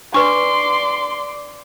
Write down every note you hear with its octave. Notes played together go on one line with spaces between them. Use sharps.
D4 B4 D5 C6 C#6